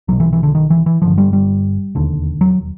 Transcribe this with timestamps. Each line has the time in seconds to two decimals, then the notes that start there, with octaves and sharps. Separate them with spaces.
0.08 B1 F#3
0.12 B2
0.20 E3
0.33 E3
0.43 D3
0.55 D#3
0.70 E3
0.86 E3
1.02 G1 G2 D3 F3
1.18 G3
1.33 G3
1.95 E1 D#2 D3
2.41 F#3